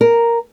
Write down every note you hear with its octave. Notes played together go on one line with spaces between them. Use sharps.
A#4